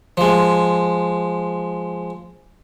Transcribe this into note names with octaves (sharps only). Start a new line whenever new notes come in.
F3 G#3